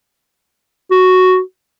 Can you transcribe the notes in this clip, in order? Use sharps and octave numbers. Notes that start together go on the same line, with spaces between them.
F#4